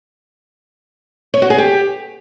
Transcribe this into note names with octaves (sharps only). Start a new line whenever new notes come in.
C#5
F#4
G#4
G4